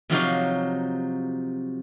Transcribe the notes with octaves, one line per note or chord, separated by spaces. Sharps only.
C3 F3 F#3 D#4 C#5 F5